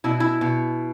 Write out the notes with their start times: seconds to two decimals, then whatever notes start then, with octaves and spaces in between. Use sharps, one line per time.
0.04 B2 E4
0.20 E4
0.41 B2